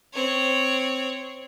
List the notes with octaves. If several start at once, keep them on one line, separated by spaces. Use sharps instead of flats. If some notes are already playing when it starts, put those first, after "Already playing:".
C4 C#5